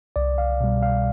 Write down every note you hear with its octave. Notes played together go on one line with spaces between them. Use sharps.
C2 D5
F5
B2 G3
F5